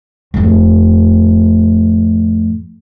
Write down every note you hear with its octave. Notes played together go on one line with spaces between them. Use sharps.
F2 A2